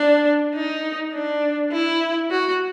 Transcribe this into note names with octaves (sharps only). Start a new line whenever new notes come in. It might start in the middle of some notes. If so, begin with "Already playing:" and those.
Already playing: D4
D#4
D4
E4
F#4